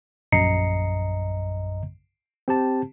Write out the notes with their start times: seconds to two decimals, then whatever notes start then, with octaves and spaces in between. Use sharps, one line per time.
0.32 A#1 F#2 D#5 A#5 C7 C#7
2.48 C4 G4 A5